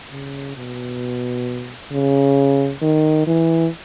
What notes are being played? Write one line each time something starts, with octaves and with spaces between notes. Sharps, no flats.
C#3
B2
C#3
D#3
E3